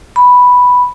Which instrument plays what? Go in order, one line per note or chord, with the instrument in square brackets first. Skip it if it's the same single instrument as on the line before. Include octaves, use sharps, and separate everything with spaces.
[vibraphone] B5